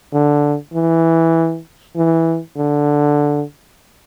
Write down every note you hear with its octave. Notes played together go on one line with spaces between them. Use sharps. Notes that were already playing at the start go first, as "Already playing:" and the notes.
D3
E3
E3
D3